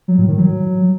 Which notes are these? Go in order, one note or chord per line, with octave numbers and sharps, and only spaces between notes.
F#3
A2
D#3
F#3